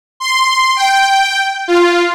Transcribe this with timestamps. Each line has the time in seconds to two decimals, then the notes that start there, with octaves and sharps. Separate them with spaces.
0.20 C6
0.76 G5
1.68 F4